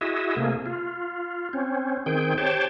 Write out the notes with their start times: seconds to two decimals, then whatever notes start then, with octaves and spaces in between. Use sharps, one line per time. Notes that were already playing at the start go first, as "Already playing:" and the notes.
0.01 E4 F#4 G#4 D#5 E5
0.36 C3 A3 A#3 G#4
0.66 F4
1.53 C4 C#4
2.06 D#3 C4 G#4 G5
2.38 G4 C5 C#5 G5 A5